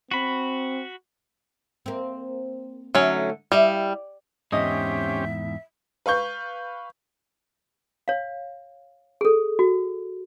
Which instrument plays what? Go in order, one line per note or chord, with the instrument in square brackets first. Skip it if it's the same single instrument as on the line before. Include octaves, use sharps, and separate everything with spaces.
[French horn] C4 [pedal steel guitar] F#4 B5
[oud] A#3 C4
[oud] D3 A3 D#4 [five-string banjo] F#3 C#4
[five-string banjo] G3 [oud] E4 D#5 F5
[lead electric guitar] E2 G#2 [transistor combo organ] C4 C#4 G4 [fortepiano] D#5 [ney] E5
[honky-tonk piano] B4 F5 C#6 G6
[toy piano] C#5 F5
G#4 A4
F#4